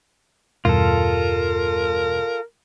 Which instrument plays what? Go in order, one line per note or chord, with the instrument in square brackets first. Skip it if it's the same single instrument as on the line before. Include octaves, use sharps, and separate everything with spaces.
[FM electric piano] E2 G2 B2 [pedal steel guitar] F4 A4 [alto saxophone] A#4